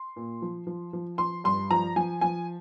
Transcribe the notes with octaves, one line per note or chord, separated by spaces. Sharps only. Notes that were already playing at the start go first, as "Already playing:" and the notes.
Already playing: C6
A#2
F3
F3
F3
F3 C6
G2 C6
F3 A#5
F3 G#5
F3 G#5